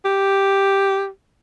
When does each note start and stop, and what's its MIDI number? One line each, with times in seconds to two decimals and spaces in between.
0.06 1.08 67